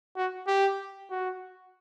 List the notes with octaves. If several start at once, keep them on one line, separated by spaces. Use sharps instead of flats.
F#4
G4
F#4